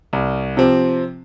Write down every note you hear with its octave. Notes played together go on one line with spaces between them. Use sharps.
C2
C3 F3 C4